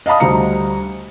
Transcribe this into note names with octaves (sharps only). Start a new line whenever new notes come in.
D#5 F5 A5 B5 D#6
D2 G3 C5 A#5 C#7